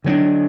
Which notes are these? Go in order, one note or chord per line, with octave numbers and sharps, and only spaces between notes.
D3 F#3 B3 D4